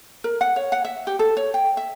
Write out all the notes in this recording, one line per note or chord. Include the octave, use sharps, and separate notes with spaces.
A#4
F#5
C#5
F#5
E5
G4
A4
C#5
G5
E5